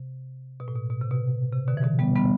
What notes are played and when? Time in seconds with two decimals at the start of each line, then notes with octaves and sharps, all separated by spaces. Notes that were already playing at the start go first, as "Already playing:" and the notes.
Already playing: C3
0.60 B2
0.68 A2
0.75 B2
0.90 B2
1.02 C3
1.11 B2
1.53 C3
1.68 B2 D3
1.77 E3
1.83 B2 D3
1.99 G3 B3
2.15 G3 B3